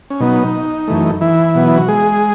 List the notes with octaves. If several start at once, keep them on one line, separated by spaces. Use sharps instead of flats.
C#4
B2 F#3 B3 D#4
F#2 E3 A3
E3 E4
B2 F#3 B3
E4
F#4
G#3 G#4